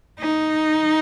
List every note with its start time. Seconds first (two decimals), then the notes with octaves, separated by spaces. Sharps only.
0.19 D#4